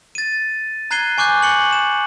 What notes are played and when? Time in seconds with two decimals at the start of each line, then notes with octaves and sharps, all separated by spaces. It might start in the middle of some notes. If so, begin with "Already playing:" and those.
0.15 A6 D#7
0.91 A#5 F#6 G#6 C7 D#7 G7
1.18 G#5 C#6 D6 F#6 G6
1.42 C#6 C#7 F#7
1.73 E7